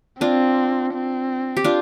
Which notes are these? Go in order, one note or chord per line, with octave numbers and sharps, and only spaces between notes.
C4 D4 F4
C4
G4
D4 F4